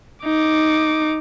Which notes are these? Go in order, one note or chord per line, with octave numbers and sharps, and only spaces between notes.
D#4 D6